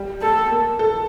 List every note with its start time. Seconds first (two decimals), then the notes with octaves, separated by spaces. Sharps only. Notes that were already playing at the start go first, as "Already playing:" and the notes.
Already playing: G3
0.22 A3 A4
0.50 A#3
0.79 A4